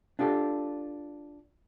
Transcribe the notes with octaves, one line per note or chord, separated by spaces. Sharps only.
D4 F4 G4 A4